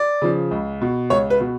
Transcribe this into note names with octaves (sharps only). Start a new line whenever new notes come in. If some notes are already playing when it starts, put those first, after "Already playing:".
Already playing: D5
C#3 F3
C#2
B2
C#2 C#5
B4
B2